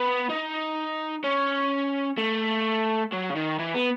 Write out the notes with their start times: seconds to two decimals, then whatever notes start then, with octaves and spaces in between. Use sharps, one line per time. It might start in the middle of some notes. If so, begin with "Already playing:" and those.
Already playing: B3
0.29 D#4
1.24 C#4
2.18 A3
3.12 F#3
3.30 C#3
3.36 D#3
3.59 E3
3.75 B3